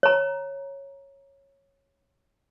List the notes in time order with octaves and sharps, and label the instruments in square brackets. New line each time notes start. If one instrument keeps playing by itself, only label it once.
[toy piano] C#5 A#5